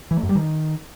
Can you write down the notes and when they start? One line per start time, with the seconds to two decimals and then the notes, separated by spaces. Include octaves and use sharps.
0.11 E3
0.17 A3
0.23 F#2
0.29 G3
0.35 D#3